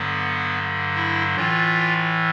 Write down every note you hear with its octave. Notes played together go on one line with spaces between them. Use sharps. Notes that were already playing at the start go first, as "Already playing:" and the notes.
Already playing: G2 D3 F#3 B3
E4
A2 E3 F4